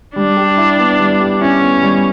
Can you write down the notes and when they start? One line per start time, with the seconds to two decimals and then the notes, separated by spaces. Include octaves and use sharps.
0.16 G3 D4
0.37 G4
0.57 E4
0.79 B3
1.00 G3
1.20 G4
1.41 C#4 E4
1.62 B3
1.82 G3